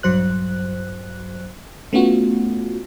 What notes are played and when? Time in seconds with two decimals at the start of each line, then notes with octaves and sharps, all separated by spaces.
0.03 A#1 G2 F#3 C5 F#6
1.93 A3 B3 C#4 F4 F#4